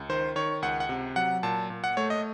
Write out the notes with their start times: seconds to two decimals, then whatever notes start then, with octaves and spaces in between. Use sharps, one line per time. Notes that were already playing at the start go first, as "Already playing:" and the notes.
Already playing: C#2
0.09 D#3 C5
0.36 D#3 C#5
0.62 C#2 F#5
0.80 F#5
0.89 C3
1.16 F#3 F#5
1.43 A#2 A5
1.70 A#2
1.84 F#5
1.97 A3 C#5
2.10 D#5